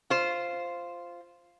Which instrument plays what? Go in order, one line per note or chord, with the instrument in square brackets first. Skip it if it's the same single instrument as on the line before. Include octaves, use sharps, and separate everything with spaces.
[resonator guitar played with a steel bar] F4 C5